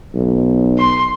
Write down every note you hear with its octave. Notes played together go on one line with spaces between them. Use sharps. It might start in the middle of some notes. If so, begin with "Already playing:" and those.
B1
C6